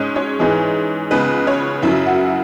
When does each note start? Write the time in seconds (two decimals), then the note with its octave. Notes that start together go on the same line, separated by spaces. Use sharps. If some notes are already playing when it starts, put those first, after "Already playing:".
Already playing: G#2 G#3 C#4 G#4 C#5
0.16 C#4 C#5
0.39 G#2 E3 G#3
1.11 C#2 C#3 G#3 B3 B4
1.47 C#4 C#5
1.82 F#2 C#3 F#3 E4 E5
2.06 F#4 F#5